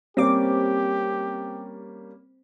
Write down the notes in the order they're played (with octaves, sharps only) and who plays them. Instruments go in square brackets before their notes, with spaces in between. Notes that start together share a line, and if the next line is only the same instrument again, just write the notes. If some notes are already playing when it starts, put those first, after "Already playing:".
[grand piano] G3 A#3 C#4 [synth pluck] C4 D6 [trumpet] G4